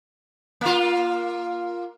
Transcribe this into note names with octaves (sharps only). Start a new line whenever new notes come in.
A#3 F4